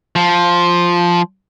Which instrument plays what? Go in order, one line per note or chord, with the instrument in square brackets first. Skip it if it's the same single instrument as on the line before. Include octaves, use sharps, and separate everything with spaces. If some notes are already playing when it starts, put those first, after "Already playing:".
[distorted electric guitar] F3